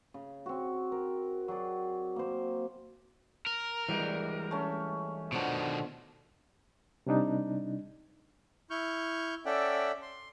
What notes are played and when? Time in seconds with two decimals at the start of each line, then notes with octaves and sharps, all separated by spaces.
0.14 C#3
0.46 C4 F#4
0.92 A#4
1.48 F#3 G#4 D5
2.16 A#3 C5
3.47 A#4
3.89 E3 G3 G#3 D5
4.51 A3 C#4 C#6
5.32 B2 D3 D#3 F3
7.07 C3 G3 D4 D#4
8.70 E4 C#6 F6 G6
9.46 C#4 A4 D5 E5 F#5 G5
10.02 C6